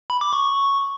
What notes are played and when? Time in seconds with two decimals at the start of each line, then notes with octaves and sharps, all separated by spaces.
0.10 B5
0.21 D6
0.33 C#6